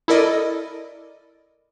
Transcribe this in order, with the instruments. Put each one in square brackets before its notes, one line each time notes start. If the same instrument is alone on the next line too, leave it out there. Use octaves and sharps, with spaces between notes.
[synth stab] E4 A4 A#4 D5 D#5